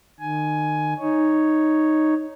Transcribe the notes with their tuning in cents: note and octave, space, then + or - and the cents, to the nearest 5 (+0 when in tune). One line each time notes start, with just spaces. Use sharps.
D#3 -35 G#5 +10
D#4 -5 C#5 +0